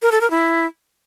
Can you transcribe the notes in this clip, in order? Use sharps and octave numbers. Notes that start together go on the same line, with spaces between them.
A#4
A4
A#4
E4